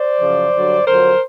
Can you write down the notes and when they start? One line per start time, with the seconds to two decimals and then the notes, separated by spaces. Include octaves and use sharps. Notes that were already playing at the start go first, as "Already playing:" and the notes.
Already playing: C5 D5
0.21 F#2 C#3 F3
0.54 G2 D3 F#3
0.86 F2 D3 F#3 A#4 C5